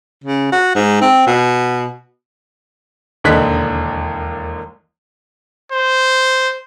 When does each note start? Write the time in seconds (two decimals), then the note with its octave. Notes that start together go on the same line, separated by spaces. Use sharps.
0.24 C#3
0.52 F#4
0.75 G#2
1.01 C4
1.27 B2
3.24 E1 D#2 D3 D#5 F#6 B6
5.72 C5